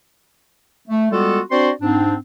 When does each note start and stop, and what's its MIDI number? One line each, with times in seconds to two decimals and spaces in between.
0.88 1.07 57
1.12 1.40 55
1.12 1.40 56
1.12 1.40 59
1.12 1.40 65
1.12 1.40 66
1.12 1.40 69
1.51 1.70 60
1.51 1.70 62
1.51 1.70 66
1.51 1.70 72
1.51 1.70 74
1.51 1.70 84
1.82 2.15 44
1.82 2.15 60
1.82 2.15 62